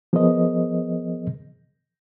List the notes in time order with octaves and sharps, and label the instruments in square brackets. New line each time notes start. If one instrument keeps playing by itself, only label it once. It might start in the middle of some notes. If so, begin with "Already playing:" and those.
[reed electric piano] F3 B3 G#4 A#4 C5 D#5